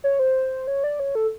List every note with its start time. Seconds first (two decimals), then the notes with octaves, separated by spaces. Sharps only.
0.04 C#5
0.19 C5
0.67 C#5
0.84 D5
1.00 C#5
1.15 A4